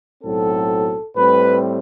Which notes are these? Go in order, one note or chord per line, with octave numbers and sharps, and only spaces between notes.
B1 A2 F#3 C4 A4
A2 G3 C4 B4